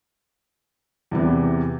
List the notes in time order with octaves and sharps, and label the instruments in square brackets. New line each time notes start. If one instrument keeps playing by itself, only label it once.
[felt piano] E2 C3 E3